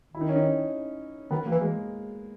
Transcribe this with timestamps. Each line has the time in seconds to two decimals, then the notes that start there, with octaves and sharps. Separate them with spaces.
0.14 D#3 E4
0.21 D#4
0.29 C#4
0.36 D#4
1.31 D#3 B3
1.46 A#3
1.51 E3
1.61 G#3